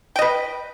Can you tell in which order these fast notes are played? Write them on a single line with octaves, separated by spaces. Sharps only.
G5 D#5 B4